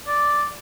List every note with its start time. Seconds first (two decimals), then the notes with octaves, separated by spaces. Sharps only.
0.07 D5